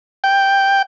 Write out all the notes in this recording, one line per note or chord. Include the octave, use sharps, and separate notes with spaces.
G5